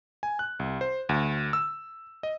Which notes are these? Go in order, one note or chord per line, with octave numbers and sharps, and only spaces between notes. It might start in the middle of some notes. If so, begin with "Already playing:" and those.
G#5
F#6
C2
C5
D2
E6
D#5